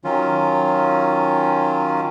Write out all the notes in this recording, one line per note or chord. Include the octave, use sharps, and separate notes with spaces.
D#3 F#3 C#4 F4